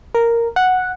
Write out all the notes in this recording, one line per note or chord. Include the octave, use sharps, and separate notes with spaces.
A#4
F#5